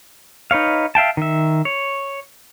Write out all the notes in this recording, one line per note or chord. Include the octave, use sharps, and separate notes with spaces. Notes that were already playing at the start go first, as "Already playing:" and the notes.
D#4 B4 C#5 F5
E5 F5 G5 A5
D#3 E5
C#5